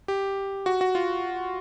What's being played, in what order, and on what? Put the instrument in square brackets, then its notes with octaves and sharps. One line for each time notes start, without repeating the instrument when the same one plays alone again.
[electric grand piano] G4
F#4
F#4
F4